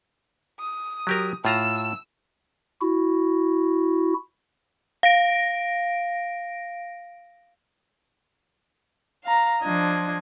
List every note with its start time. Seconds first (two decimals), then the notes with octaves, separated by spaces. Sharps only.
0.59 D#6
1.07 F#3 G4 A#4
1.45 A2 F4 A#5 E6
2.81 E4 F#4
5.03 F5 A#6 D7
9.25 F5 A#5
9.63 F3 D4 D#5 G#6